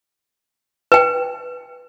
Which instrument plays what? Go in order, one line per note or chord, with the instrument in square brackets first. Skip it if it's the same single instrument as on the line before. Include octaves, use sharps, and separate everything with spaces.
[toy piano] B4 G5